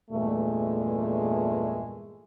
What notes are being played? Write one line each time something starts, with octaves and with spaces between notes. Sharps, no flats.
E2 G2 A#2 G#3 A3